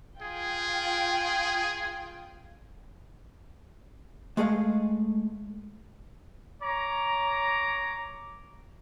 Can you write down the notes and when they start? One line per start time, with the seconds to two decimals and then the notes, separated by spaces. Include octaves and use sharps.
0.22 F4 G#4 G5
4.37 G#3 A3 G#4 D#5 F5
6.62 C#5 A#5 D6